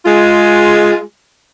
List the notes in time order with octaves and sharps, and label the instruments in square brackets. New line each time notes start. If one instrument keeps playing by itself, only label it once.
[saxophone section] G#3 F4